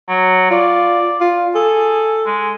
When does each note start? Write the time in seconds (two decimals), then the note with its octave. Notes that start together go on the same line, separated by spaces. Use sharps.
0.09 F#3
0.51 F4 D5
1.20 F4
1.55 G#4 A4
2.26 G#3